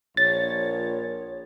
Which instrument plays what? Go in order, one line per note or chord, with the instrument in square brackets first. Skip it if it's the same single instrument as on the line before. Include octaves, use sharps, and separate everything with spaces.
[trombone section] A#1 [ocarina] C#5 [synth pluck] A6